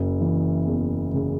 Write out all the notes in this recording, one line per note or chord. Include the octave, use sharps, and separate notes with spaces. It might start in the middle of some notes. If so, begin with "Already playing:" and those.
Already playing: F#1
E3
E2
C#3